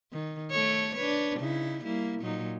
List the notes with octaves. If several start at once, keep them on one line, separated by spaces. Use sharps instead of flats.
D#3
A3 A4 C#5
D4 B4 C#5
C#3 D#4 E4
G3 A#3 E4
A#2 F#3 D#4